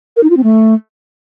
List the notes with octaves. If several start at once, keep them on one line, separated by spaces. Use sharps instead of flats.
A#4
D#4
F4
C4
A3